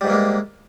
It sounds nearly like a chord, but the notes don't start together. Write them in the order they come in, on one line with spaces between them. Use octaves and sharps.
G3 G#2 E3 A#3 G#3